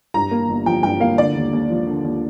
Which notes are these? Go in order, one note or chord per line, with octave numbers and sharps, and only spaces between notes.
G2 A#5
A#3
G1
F3 G5
G2 G5
A#3 F5
D3 D5
D#2
D#2
F3
D3
D#2